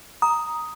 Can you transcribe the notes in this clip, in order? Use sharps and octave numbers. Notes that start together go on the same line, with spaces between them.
A#5 D#6